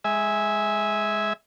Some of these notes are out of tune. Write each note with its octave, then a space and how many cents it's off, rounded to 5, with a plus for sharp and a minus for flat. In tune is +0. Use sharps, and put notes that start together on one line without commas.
G#3 +0 E5 -15 G#5 +0